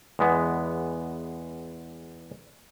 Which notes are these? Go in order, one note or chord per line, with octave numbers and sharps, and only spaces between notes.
E2 G#3 B3